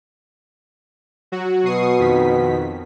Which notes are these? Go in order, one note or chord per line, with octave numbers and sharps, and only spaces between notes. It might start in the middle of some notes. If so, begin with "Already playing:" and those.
F#3 F#4
B2 C#6 D#6 C7
F2 D#3 B6